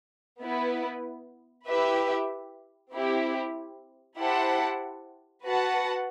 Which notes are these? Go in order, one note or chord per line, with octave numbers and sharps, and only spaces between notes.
B3 E4 B4
E4 G4 B4 E5
C4 E4 G4
E4 G4 C5 F#5 A5
F#4 B4 F#5 A5